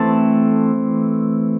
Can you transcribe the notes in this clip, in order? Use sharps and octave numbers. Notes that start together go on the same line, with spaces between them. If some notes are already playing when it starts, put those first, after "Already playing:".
Already playing: E3 A3 C4 A5